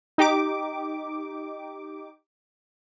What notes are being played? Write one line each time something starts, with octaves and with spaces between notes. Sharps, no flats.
D#4 G4 D6